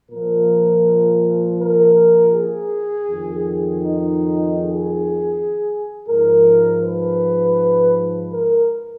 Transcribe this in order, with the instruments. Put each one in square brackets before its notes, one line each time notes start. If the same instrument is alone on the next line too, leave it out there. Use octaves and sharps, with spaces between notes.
[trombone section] A#2 F3 A#4
A#4
G#4
F2 D#3
D#4
G#4
G#2 F3 A#4
B4
A#4